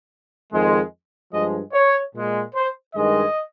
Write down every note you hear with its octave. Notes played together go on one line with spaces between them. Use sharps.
F2 D#3 G#3
G2 F3 G#3 D#5
C#5
A#2 G#3
C5
G2 D#3 G#3 D#5